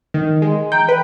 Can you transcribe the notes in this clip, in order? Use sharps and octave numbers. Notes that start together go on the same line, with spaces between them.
D#3
G#3
E3 G5 A#5 G6
B4